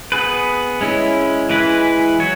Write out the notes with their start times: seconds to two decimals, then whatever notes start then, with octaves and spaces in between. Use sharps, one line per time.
0.12 B3 G#4 B4
0.81 G#3 C#4 E4
1.50 E3 G#3 E4 B4
2.20 F#3 C#5